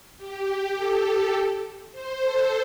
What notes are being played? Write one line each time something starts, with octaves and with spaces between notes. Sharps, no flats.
G4
A4
C5
A4